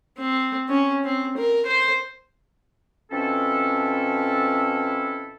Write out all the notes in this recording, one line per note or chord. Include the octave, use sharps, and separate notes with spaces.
C4
C#4
C4
A#4
C5
B2 F3 C4 C#4 E4 A4